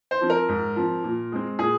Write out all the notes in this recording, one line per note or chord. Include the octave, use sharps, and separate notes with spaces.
C5
F3 C4
A#4
G#2
F3 C4
A#2
G#3 C4
A#2 G#4